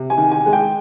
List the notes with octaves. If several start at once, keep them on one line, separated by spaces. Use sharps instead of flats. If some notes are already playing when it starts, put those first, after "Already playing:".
Already playing: C3
G#5
D#3
G#5
G#3
G5